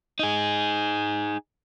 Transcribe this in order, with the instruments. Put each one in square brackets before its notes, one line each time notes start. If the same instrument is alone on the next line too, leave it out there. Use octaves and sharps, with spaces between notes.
[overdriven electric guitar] D#4 G#4